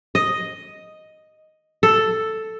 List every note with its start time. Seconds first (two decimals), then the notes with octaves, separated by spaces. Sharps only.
0.15 D#5
1.83 A4